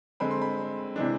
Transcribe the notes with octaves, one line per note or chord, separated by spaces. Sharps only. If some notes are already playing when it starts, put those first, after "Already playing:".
D3 G#3 C4 B5
C6
B5
C3 E3 G#3 D4